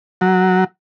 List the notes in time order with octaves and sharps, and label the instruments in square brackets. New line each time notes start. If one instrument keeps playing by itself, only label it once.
[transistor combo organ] F#3